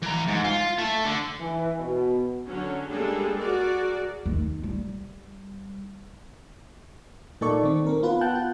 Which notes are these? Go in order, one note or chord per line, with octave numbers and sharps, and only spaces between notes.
E3 A#5
G#2
F4
A3 A4
D3
E3
B2
D3 F#3 C#4
G3 G#3 A#3 D4 G#4 A4
F#4 G#4 A#4 D5
D#2
G3
A#2 A#3 D#4 A4 D5 C#6
D#3 C4
C4 A#4
B3 F4 B4
F#5 G5 A5 F#6 G6
F4